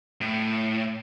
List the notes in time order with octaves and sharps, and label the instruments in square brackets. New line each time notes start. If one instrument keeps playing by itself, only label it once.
[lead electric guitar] A2